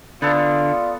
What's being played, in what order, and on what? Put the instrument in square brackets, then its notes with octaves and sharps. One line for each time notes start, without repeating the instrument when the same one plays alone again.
[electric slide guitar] D3 [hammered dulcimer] B3 A4 [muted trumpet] F4 [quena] D5